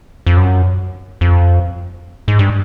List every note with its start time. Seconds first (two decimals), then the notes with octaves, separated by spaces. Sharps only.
0.26 F2
0.37 F#2
1.21 F2
2.28 G#2
2.39 G2